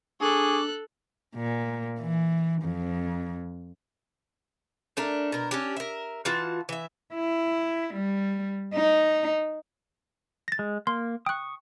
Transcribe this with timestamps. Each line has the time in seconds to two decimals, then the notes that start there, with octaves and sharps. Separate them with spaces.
0.21 D4 G#4 A4 C#6 D6 F#6
1.36 A#2
2.00 E3
2.63 F2
4.97 A3 D4 A#4
5.32 B2 A#4
5.51 C#4 D4 G4
5.77 A#4 E5
6.25 E3 F4 F#4 A5
6.69 E3 E5
7.15 E4
7.95 G3
8.74 D#4
10.48 A6 A#6
10.59 G#3
10.87 A#3 C6
11.26 G5 C#6 D#6 F#6